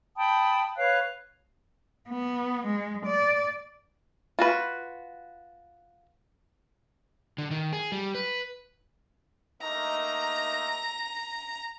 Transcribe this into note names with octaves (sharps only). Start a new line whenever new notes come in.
G5 A5 B5 D#6
B4 C#5 F5 F#6
B3
G#3
D5
F4 F#4 B4
D3
D#3
G#4
G3
B4
A3 A#3 D#4 A#5